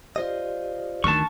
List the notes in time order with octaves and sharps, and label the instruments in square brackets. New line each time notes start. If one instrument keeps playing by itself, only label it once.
[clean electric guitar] F4 C5 D#5 [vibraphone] G4 D5
[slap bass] D2 D#3 [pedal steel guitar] A5 C#6